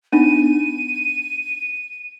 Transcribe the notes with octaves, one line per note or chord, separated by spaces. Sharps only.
B3 D4 D#4 D#7